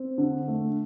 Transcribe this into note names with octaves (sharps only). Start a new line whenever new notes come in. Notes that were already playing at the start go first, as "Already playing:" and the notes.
Already playing: C4
D3
A3